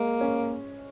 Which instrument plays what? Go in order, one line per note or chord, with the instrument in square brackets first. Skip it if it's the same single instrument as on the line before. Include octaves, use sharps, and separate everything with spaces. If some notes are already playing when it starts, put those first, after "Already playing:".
Already playing: [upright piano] G#3 [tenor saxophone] A#3
[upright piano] C#4